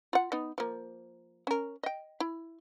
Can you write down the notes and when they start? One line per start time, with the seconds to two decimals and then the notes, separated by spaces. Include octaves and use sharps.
0.13 F4 F#5
0.32 B3 D#4
0.58 F3 A#3
1.47 C#4 A#4
1.83 D#5 G5
2.20 E4